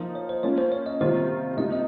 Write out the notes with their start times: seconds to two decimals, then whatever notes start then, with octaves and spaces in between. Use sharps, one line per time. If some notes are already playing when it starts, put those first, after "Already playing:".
Already playing: F3 A#3 D#4
0.15 C#5
0.29 C5
0.43 A#3 C#4 F4 C#5
0.58 C5
0.72 C#5
0.86 D#5
1.00 C3 D#3 G3 A#3 F4 C5
1.57 C3 G3 A#3 D#4 D#5
1.72 D#5